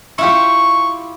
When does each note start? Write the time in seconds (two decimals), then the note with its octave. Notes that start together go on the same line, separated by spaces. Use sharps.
0.18 E4 F4 G4 C#6